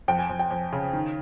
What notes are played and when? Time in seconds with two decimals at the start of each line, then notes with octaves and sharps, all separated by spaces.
0.08 F2 G5
0.19 G#5
0.29 F2
0.39 G5
0.51 F2
0.73 C#3
0.93 D#3